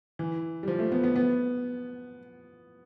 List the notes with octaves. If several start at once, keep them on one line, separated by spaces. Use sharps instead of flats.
E3
G3
F3
A3
B3
B3
B3